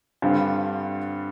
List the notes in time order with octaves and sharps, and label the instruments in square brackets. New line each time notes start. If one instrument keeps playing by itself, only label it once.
[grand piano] G2 D3 G3 C4 F4